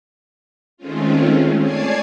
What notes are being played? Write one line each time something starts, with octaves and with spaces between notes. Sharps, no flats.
D#3 G#3 A3 C4 C#4 F4
C#5 D5 G#5 A5 G#6 C7